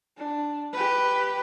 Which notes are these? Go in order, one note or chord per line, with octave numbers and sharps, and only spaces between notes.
D4
G4 B4